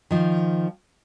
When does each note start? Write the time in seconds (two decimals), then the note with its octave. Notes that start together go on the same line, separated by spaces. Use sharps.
0.11 D#3 F3